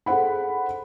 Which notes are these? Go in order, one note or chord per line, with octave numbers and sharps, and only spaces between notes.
G#4 A4 C5 F#5 B5